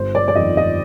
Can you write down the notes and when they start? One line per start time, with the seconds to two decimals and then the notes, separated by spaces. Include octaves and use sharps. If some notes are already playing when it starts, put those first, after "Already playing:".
Already playing: G1 C5
0.15 D5
0.28 D5
0.35 F2 D#3 D#5
0.57 D#5